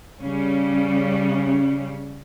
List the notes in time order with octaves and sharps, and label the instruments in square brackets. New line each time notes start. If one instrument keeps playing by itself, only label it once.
[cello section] C#3 G3 C#4